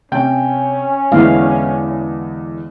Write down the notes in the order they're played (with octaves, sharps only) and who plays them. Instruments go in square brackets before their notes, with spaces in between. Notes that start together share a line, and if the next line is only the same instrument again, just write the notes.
[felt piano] C3 G5 [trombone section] C#4
[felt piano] E2 D3 G#3 [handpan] B3 E4 F5